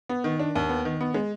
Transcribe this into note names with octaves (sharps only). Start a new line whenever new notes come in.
B3
D#3
D4
D#2
B3
D#3
B3
G#3